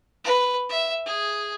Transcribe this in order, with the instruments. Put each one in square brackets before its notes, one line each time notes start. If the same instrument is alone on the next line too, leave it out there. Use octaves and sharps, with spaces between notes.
[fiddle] B4
E5
G#4